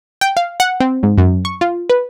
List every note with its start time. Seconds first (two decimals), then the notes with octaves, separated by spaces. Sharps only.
0.21 G5
0.37 F5
0.60 F#5
0.80 C4
1.03 G#2
1.18 F#2
1.45 C#6
1.61 F4
1.90 B4